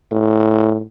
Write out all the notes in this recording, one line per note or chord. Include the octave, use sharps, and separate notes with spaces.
A2